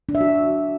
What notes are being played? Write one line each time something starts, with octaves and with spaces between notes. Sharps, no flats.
D4
E5
F#4